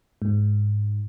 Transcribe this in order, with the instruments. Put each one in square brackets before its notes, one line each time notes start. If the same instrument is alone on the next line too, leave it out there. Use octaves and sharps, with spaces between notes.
[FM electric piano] G#2